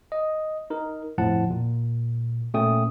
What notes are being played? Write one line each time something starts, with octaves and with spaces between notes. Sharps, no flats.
D#5
D#4 A#4
G1 F2 A2 F3 F#5 A5
A#2
A#2 A3 C#4 G5 D#6